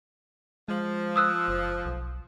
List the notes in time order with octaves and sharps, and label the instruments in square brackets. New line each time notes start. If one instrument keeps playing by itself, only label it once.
[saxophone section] F3 [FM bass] G#3
[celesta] D#6 E6 F#6
[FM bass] F#1
B1